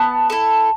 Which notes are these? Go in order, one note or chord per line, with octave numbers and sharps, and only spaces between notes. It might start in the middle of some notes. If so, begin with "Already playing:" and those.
Already playing: B3 A5
E4 A4